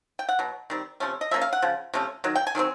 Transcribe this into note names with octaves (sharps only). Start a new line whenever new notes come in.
G5
F#5
B2 F#3
D#3 G3 C4
C3 F3 A3 C#4
D#5
F3 A#3 C#4 E5
F5
F#5
C#3 F3
C3 F3 A3 C#4
D#3 F#3
G5
G#5
D#3 F#3 A3 C4